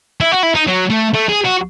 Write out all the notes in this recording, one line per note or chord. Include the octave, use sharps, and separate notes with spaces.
E4
F#4
E4
D#4
F#3
A3
A3
G#4
F#4